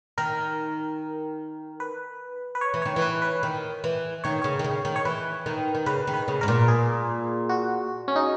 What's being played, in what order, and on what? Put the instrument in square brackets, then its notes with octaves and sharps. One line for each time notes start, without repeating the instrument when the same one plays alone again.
[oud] D#3 [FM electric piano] A#4
[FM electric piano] B4
B4
C#5
[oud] E3
[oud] D#3 [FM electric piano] C#5
[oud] E3
[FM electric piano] B4
B4
[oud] D#3
E3
[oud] D#3 [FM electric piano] C#5
[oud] C#3 [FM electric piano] C#5
[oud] D#3
C#3
D#3
[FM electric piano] C#5
[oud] E3 [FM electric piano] B4
[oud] D#3
D#3
[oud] C#3 [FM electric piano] B4
[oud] D#3
[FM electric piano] B4
[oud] C#3
[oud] G#2 [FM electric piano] A#4
[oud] A#2
[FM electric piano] G#4
F#4
C#4
D#4